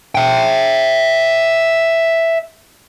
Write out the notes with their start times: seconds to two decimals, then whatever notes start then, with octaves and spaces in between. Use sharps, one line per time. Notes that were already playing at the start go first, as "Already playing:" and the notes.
0.15 E5 G5